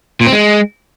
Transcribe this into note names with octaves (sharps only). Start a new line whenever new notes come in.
A#2
C4
G#3